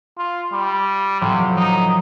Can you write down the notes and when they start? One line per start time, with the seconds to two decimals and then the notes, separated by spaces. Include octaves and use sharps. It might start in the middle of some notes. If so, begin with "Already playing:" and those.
0.18 F4
0.52 G3
1.21 A2 C3 F3 F#3
1.57 D#4